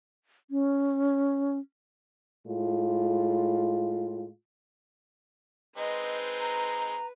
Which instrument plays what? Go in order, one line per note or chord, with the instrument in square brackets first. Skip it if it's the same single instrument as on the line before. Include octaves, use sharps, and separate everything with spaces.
[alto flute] C#4
[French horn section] A2 G#3 F4
[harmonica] G#3 C4 D#4 [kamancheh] B4 [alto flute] D#5
[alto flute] A#5